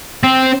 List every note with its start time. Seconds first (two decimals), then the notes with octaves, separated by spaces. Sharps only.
0.23 C4